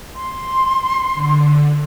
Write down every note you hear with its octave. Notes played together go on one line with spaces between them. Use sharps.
C6
D3